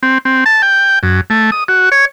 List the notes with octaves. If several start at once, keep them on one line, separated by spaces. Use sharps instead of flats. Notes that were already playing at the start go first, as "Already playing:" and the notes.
C4
C4
A5
G5
F#2
A3
D#6
F#4
C#5